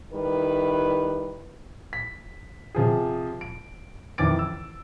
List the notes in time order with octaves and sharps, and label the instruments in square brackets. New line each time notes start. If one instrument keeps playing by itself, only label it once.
[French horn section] D#3 G3 E4 B4
[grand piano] B6
C3 F3 G#4
D7
F2 D#3 E3 D6 A6 D7
E6